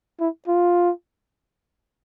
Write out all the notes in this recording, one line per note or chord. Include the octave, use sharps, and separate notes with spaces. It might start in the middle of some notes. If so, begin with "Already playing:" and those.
E4
F4